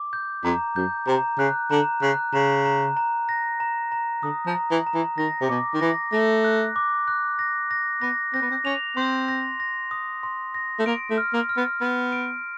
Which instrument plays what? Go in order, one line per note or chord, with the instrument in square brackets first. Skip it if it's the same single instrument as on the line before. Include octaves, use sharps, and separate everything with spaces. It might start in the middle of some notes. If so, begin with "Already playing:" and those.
Already playing: [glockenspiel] D6
G6
[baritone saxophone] F2 [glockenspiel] A#5
[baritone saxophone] F#2 [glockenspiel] G6
[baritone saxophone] C3 [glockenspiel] A#5
[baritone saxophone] C#3 [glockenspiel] F#6
[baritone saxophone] D3 [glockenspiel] A#5
[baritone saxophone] C#3 [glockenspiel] F#6
[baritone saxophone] C#3 [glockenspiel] A#5
[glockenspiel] A#5
A#5
A#6
A#5
A#5
[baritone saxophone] D3 [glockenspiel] D#6
[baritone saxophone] F3
[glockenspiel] A#5
[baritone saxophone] E3
[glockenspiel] A#5
[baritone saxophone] E3
[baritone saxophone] D#3 [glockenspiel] A#6
[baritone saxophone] C3
[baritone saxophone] B2 [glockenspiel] D6
[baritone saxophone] D#3
[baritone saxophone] E3 [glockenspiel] A#6
[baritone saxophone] A3 [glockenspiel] A#6
[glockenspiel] F#6
D6
F#6
A#6
A#6
[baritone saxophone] B3 [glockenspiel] A#6
[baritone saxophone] C4 [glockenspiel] A#6
[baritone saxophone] B3
C4
[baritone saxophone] C#4 [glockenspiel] F7
[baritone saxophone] C4 [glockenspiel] C6
[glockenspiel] A#6
A#6
D#6
C6
A#6
[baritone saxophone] A3
[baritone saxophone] A#3 [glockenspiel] D7
[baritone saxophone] A3
[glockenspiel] F6
[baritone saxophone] A#3
[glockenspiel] F6
[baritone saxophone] B3
[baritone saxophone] B3 [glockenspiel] F6
[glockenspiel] D7